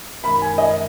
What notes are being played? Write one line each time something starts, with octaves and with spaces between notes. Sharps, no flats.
F#2 D#3 G#3 D#4 A#4 B5
G#5
D#5